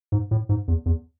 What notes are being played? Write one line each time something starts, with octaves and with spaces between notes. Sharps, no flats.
G#2
A2
G#2
E2
E2